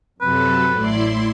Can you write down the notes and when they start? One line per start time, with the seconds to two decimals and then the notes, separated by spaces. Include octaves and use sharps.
0.22 F#2 C3 F#3 A4 B4
0.77 A1 A2 E4 D5 C6